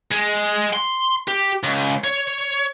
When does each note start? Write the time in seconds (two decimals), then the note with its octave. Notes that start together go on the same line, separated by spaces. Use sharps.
0.12 G#3
0.73 C6
1.28 G4
1.64 C#2
2.04 C#5